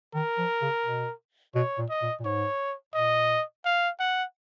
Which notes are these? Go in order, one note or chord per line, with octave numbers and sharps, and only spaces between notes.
D#3 A#4
F3
C#3
B2
B2 C#5
A#2
D#5
A#2
A#2
G#2 C#5
A#2 D#5
F5
F#5